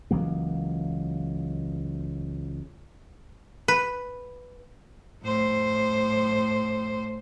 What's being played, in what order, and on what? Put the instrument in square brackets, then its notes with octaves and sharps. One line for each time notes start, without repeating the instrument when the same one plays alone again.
[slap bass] C#2 E3 F#3 A#3
[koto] B4
[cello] A2 C5